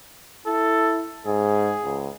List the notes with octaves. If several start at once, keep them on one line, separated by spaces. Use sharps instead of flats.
E4 A4
G#2 G#4
C#2